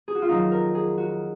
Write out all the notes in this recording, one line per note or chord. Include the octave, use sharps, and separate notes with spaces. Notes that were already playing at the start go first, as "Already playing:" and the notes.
G#4
F#4
F4
F2 D#3 F#3 D#4
A#4
G#4
F#4